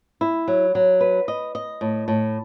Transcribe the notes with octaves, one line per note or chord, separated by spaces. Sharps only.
E4
F#3
F#3
B4
D#5
D#5
A2
A2